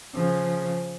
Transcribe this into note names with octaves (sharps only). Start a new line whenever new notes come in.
C#3 F3